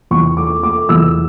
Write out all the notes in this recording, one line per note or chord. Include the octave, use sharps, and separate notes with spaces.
E2 C#6
A3 D6
A3 D6
E2 E6